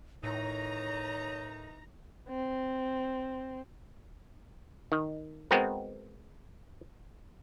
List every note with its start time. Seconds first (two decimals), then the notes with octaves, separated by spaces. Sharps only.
0.24 A2 D#3 E3 D#4 C#5 A#5
2.29 C4
4.92 D#3
5.51 G#3 B3 C4 F#4 A#4